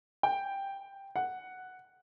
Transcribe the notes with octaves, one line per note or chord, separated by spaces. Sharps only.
G5
F#5